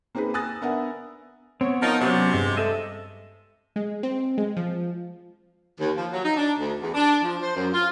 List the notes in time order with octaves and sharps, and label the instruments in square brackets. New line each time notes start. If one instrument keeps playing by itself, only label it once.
[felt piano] A#3 C4 D#4 G#4 B4
G#5 D#6 E6 F#6 A6 A#6
B3 D4 A#4 E5 F#5 G#5
[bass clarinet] B3 [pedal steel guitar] C4 [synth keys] C#5
[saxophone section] F3 D#4 [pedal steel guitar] A#4
[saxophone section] C3 [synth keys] F#3 [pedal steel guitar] C#4 D5
[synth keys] G2 G#3
[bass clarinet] A4 [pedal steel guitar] D#5 E5
[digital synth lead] G#3
C4
G#3
F3
[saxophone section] D#2
F3
F#3
D#4
D4
D2
E2
D4
F3
C5
F#2
F4